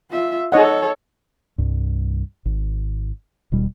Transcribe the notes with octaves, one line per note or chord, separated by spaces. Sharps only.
F4 E5
D#4 A4 C#5 D#5 F#5
C2 G2
G#1
D#1 B2 G3